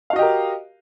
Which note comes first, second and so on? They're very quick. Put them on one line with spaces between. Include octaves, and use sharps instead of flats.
F5 F#4 D#5 G4 A#4